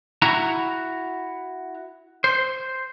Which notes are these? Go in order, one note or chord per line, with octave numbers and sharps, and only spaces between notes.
E4 F#4 A#5
C5